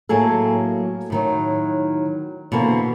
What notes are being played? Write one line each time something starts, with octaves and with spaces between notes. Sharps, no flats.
A2 F#3 A#3 G#4 A4
A2 D#3 F#3
B2 D3 E3 A#3 C4